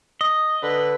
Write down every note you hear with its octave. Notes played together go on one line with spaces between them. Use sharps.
D#5
D3 B4